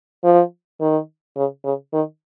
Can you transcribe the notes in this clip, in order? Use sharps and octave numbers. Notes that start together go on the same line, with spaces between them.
F3
D#3
C#3
C#3
D#3